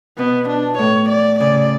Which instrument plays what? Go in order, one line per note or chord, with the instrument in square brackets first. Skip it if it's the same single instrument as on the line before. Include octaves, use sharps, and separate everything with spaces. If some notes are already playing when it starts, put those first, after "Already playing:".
[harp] B2 [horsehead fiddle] B3
[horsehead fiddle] D4
[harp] A2 [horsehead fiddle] C#5
[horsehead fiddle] D5
[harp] C#3 [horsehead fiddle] D5